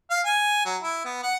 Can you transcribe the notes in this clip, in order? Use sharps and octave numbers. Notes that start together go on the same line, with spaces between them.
F5
G#5
F#3
E4
B3
F#5